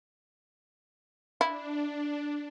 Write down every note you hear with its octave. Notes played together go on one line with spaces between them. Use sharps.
D4 E4